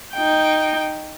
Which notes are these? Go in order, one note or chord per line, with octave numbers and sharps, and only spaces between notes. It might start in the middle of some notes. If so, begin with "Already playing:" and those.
D#4 G5